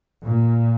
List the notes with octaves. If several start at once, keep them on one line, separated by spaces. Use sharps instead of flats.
A#2